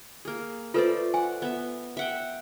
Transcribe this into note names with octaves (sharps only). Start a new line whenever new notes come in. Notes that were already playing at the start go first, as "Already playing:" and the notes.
A#3 G#4
A3 F4 A4 B4 C5 D5
F#5 G#5
B3 E5
E5 F#5 G5